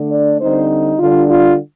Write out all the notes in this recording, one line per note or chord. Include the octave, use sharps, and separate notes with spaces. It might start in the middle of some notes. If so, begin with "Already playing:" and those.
Already playing: D3 A3 D4
D5
D3 G3 C4 D#4 C5
D3 G3 D4 F4
F4